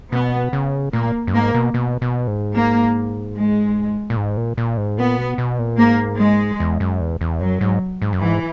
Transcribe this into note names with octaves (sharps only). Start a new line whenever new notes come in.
B2 B3
C#3
A#2 A#3
F#2
G#2 A#3
B2
B2
B2
G#2
A#3
G#3
A#2
G#2
A#2
A#2
G#2
A#2 B3
B2
B2
A#2
G#2 A#3
G#3
E2
F#2
E2
E2
F#2 F#3
G#2
G#2
F#2
G#2 E3